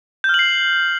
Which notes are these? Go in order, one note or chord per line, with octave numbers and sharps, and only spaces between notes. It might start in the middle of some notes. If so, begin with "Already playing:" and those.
F6 G6 C7 F#7